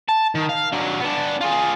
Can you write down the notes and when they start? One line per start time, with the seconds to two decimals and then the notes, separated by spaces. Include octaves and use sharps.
0.09 A5
0.35 D#3
0.49 F5
0.72 F#3 D4
1.00 B3 D4
1.41 F4 G#4